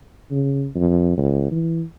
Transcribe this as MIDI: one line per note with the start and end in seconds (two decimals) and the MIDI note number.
0.31 0.67 49
0.75 1.16 41
1.17 1.47 37
1.51 1.83 52